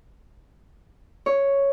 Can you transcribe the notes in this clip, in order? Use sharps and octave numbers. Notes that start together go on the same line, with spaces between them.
C#5